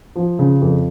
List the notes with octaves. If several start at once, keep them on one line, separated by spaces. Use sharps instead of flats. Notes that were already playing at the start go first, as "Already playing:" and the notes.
F3
C#3
F2